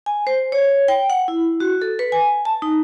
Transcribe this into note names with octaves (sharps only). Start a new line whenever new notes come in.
G#5
C5
C#5
G5
F#5
E4
F#4
A4
B4
G#5
A5
D#4